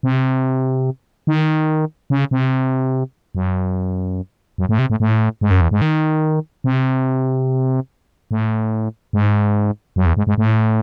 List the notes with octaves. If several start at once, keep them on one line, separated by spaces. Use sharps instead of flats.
C3
D#3
C#3
C3
F#2
F#2
A2
C3
A2
A2
G#2
F#2
E2
G#2
D#3
C3
A2
G#2
F#2
E2
G#2
G#2
A2